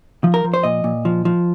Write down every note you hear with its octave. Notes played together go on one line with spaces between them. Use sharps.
F3
A#4
F3
C5
A#2 D#5
A#2
F3
F3